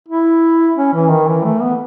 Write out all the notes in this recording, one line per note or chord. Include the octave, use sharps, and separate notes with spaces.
E4
C#4
E3
D#3
E3
A3
B3